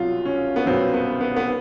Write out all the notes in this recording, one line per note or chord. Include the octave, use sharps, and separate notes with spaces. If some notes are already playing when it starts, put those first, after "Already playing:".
Already playing: C2 B2 F#3 F4
C#4
B3
C2 B2 F#3 C4
B3
B3
B3